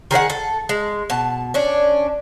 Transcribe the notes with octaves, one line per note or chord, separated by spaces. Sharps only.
D#3 G#4 C#5 F#5
A4
G#3
B2 A5
C#4 D4